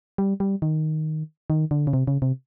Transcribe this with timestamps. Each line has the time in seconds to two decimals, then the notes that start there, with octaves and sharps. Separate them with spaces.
0.18 G3
0.40 G3
0.62 D#3
1.50 D#3
1.71 D3
1.87 C#3
1.93 C3
2.07 C#3
2.22 C3